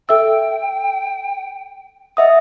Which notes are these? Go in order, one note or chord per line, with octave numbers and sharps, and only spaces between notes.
A4 E5 G5 E6
D#5 E5 F#5 D#6